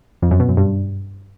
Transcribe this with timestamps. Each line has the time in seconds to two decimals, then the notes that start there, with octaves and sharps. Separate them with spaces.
0.22 F2
0.31 F#2
0.40 B2
0.49 F#2
0.57 G2